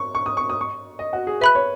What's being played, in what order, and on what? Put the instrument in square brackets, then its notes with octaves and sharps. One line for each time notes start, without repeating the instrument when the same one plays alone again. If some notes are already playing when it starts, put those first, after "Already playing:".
Already playing: [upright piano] C#6
C#6
D#6
C#6
D#6
C#6
D#5
F#4
G#4
[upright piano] B4 [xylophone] E5 B5 F#6
[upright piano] C#5